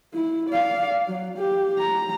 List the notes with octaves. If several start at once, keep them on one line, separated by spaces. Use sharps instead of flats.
E4
D5 F5
F#3
G4
A#5